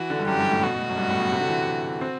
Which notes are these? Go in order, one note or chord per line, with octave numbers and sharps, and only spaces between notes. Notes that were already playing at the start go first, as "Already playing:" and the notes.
Already playing: E3 F#4
D3
G2
F#2 G4
G2
A2
B2 F#4
B2
A2
F#2
G2
A2
B2
C3
D3
E3
C4